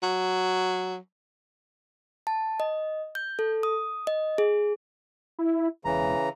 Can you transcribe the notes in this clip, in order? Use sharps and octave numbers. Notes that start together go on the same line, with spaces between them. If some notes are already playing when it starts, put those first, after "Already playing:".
F#3
A5
D#5
G6
A4
D#6
D#5
G#4
E4
E1 C#3 E3 A#5